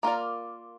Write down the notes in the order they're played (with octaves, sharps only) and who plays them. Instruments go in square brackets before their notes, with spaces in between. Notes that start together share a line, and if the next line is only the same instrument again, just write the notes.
[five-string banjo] A#3 F4 A#4 D5